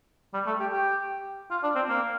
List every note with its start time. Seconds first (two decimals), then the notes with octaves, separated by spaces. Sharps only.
0.34 G3
0.46 A3
0.60 G4
0.72 G4
1.51 F4
1.63 D4
1.76 C4
1.89 A#3